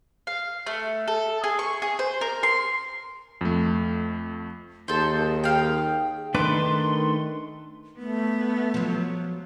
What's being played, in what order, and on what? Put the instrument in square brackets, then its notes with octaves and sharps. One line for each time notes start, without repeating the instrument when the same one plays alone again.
[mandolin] F5
A3
A4
G#4
C#6
G#4
C5
A#4
C6
[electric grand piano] F2 A3
[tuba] D#2 [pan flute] G#4 [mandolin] A4 C5
[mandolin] F5 G5
[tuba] D#3 [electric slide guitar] A3 D4 B4 [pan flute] C6 [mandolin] D6
[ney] A3 [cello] B3
[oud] F3 F#3